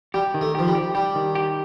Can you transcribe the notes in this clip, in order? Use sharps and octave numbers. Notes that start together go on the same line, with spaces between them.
G3 G4
D#3
A3
F3 G4
G3
G4
G3 G4
D#3
G4